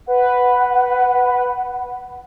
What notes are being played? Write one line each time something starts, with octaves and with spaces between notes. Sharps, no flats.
B4 F#5